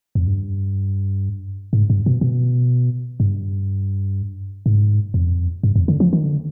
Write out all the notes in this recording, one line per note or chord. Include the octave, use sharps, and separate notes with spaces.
F2
G2
G#2
G2
B2
B2
G2
G#2
F2
G2
F2
D3
F3
D#3
D3